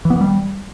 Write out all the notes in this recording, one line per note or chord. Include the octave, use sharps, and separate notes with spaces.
E3
B3
E3
G3